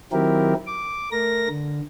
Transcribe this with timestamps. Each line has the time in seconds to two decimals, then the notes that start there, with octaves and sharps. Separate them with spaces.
0.12 D#3 F#3 C4 E4 G4 A#4
0.67 D6
1.12 A3 A#4 A#6
1.49 D3